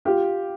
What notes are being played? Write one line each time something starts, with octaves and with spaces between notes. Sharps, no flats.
F4 G4